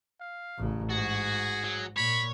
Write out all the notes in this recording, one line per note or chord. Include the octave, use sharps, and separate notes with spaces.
F5
A1 C#3
G#2 F#4 G#4
F#3
A#2 C#5 B5